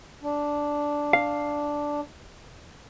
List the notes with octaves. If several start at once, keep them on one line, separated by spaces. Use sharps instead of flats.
D4
F5